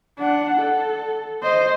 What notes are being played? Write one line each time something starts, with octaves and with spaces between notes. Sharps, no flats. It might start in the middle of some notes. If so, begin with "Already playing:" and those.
D4 F#5
A4
C5 D#5